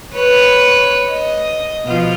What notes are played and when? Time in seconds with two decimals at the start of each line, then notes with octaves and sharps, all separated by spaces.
0.15 B4 C#5
1.10 D#5
1.85 B2 F3 F4